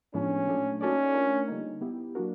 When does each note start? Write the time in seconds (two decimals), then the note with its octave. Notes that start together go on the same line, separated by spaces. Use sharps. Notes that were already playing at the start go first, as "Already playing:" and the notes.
0.14 A2 F3 G#3 B3 C#4 D4
0.47 A#2 F#3 A3 D4
0.81 A#3 C#4 D#4 F#4 A4 D5
1.14 A3 D4 F4 A#4
1.48 D3 G3 A#3 D#4
1.81 B3 E4 G4
2.15 F#3 A#3 D4 F#4 A#4